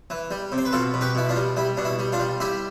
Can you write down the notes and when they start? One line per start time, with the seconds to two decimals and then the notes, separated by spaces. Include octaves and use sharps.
0.10 E3
0.31 G3
0.52 C3
0.58 C5
0.65 B4
0.72 B2 F4 A4
0.94 B2
1.01 G4 B4
1.15 B2 E4
1.29 D4 F4
1.36 G3
1.57 G3 E4
1.77 B2 D4
1.85 E4
1.99 G3
2.13 D4 F4
2.19 G3
2.40 G3 E4 G4